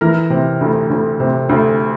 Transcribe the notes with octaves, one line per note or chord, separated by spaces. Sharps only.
E3 A#4
C3
D2
D2
C3
D2